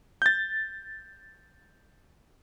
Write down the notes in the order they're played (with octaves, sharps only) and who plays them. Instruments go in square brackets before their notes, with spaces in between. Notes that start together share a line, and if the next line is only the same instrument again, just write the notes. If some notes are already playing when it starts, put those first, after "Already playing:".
[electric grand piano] G6 A6